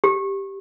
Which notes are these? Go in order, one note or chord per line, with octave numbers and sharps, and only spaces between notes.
G4